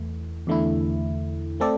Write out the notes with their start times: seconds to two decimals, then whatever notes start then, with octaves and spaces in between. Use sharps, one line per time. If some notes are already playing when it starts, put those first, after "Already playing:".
Already playing: E2 E3 A3
0.47 E2 D3 A3 E4
1.60 A3 C4 A4 D5